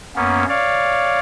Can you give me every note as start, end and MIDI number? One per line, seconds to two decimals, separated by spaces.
0.16 0.45 42
0.16 0.45 58
0.16 0.45 59
0.16 0.45 61
0.49 1.20 73
0.49 1.20 74
0.49 1.20 77